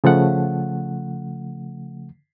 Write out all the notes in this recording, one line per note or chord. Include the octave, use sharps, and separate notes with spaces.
C#3 F3 A3 F#5